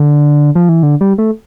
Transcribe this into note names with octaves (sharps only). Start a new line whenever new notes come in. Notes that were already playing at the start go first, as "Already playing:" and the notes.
Already playing: D3
F3
E3
D3
G3
A3